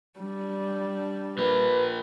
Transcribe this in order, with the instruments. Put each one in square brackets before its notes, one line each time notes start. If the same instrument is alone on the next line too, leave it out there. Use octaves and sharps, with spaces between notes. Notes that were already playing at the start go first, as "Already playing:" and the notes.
[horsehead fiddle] G3 D4
[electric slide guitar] F3 A#3 [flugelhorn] B4